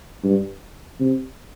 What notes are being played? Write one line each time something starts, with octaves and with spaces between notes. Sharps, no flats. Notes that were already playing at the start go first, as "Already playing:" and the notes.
G2
C3